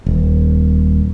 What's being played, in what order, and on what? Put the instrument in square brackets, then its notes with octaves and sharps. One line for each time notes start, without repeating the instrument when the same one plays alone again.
[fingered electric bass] D#1